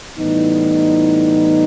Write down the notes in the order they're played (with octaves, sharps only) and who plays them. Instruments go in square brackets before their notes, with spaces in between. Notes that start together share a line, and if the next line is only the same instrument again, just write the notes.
[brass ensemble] A2 E3 G3 B3 D#4